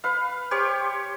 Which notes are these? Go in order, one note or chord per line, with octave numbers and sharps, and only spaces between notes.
B4 F5
G4 C5 C#5